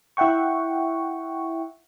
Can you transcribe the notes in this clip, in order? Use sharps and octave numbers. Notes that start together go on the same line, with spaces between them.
E4 E5 F#5 G5 C#6